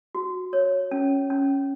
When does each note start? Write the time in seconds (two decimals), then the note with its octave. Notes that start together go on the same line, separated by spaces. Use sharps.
0.15 F#4
0.53 C#5
0.91 C#4
1.30 C#4